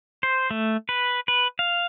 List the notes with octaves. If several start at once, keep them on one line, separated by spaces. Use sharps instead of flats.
C5
A3
B4
B4
F5